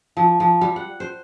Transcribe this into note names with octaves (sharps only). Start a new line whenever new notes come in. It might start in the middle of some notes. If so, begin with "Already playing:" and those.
F3
F3
G3
F#5
C5